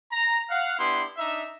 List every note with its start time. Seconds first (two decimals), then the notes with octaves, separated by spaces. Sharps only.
0.12 A#5
0.50 F5 F#5
0.79 B3 D4 E4 G4 C6
1.18 D4 D#4 E5